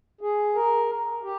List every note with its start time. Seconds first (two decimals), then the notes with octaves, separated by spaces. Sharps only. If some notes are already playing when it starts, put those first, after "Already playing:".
0.21 G#4
0.55 A#4
1.23 G4